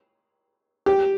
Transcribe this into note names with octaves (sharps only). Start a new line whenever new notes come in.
G4